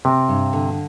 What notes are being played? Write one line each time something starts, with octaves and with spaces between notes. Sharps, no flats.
C3 C4
G2
D3